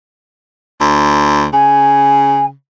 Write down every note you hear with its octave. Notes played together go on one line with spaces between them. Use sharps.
D2
C#3 G#5